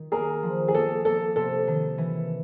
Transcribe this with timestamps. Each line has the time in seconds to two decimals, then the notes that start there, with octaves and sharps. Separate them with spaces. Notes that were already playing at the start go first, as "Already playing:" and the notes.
Already playing: D#3
0.12 A#3 G#4 A#4
0.43 F3
0.68 G#4
0.74 A#3 A4
1.05 A#3 A4
1.36 C3 A4
1.67 D#3
1.98 E3